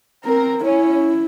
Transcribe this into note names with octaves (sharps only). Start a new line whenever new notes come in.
C4 A#4
C#4 E4